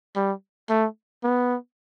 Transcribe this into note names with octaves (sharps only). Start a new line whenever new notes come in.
G3
A3
B3